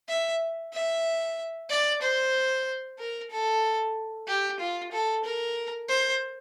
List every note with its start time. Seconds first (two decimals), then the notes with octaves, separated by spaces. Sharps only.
0.08 E5
0.73 E5
1.69 D5
2.01 C5
2.98 A#4
3.30 A4
4.27 G4
4.59 F4
4.92 A4
5.24 A#4
5.88 C5